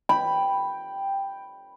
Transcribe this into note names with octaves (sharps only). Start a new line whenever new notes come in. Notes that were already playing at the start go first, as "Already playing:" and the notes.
G5 B5